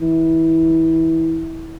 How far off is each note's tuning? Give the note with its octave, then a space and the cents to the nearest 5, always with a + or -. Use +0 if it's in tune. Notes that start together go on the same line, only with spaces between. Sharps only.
E3 -20